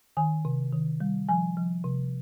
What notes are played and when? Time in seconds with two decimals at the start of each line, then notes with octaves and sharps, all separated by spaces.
0.17 D#3 G#5
0.45 C3
0.72 D#3
1.00 G3
1.29 F3 G#5
1.57 F3
1.84 C3